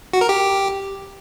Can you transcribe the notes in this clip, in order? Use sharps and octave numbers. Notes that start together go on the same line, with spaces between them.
F#4
A#4
G4